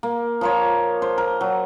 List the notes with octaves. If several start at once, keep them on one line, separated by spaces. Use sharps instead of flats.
A#3
F3 A#3 C#5
C5
A#4
F#3